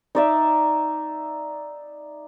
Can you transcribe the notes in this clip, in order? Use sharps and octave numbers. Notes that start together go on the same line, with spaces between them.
D#4 D5 E5